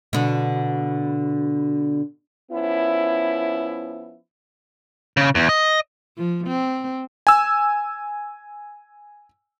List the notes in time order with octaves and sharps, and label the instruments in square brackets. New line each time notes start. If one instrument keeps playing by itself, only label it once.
[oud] B2 D3
[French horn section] F3 B3 C#4 E4
[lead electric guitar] C#3
E2
D#5
[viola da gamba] F3
C4
[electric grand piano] G#5 E6